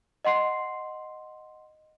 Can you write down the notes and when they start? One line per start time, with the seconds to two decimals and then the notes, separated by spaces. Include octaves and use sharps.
0.25 D#5 F#5 C6 C7